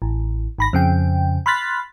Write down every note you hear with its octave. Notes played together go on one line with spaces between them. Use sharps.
A1
G#1 B5 A#6
F2 C#3 G5
B5 C6 F6 F#6 A6 B6